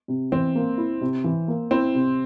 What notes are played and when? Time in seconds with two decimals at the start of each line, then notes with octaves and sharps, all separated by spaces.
0.08 C3
0.32 E3 C4
0.55 A#3
0.77 E4
1.01 C3
1.24 E3
1.48 A#3
1.71 C4 E4
1.95 C3